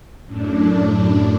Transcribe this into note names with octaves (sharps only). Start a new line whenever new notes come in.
F#2 A2 D4